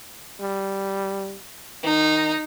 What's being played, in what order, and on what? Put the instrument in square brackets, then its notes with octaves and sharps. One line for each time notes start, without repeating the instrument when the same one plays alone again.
[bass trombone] G3
[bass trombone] D#3 [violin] D#4